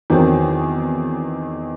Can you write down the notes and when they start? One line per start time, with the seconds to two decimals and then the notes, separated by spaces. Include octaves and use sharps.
0.10 E2 D#3 F#3 C4